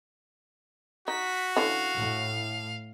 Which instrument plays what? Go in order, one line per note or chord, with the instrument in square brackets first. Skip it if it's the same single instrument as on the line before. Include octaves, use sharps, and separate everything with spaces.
[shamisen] D#4 [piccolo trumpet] F#4 [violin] B6
[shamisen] D3 E3 C#4 [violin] F5
[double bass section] A2